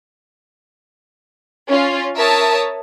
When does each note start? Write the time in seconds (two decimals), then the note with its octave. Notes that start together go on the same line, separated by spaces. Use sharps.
1.69 C#4 F4
2.16 A#4 C#5 E5 A5 D#6